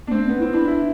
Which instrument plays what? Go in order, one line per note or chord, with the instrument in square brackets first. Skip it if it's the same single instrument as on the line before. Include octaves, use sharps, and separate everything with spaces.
[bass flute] B3 [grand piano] D4
[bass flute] A3 [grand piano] C4
[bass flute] C4
[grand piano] B3
[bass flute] E4
[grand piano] C4
[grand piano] D4 [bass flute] E4
[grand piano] E4